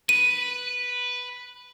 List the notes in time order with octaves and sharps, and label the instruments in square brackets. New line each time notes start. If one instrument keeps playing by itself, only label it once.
[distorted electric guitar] B4 [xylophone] D#7